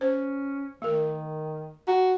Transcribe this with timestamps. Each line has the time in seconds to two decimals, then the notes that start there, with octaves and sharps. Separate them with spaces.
0.01 C#4 C5
0.82 D#3 A3 A#4
1.87 F#4 A#5